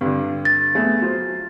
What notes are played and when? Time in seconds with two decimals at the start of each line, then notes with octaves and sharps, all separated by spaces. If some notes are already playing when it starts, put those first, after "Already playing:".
0.01 G2 D3
0.45 A6
0.75 A3 B3 G#4
1.01 F#3 F4 C5